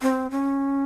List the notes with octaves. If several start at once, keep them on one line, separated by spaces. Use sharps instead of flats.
C4
C#4